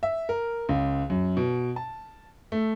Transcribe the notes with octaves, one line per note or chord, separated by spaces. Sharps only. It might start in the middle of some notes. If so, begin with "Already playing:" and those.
E5
A#4
C#2
F#2
B2
A5
A3